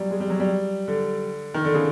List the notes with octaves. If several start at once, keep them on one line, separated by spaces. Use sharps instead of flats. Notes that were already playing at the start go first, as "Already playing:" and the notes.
Already playing: F#3 G3
G#3
G3
F#3
G3
D3
D#3
D3
C#3